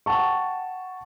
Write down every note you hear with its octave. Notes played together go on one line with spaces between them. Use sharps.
F#5 G5 A5 C#6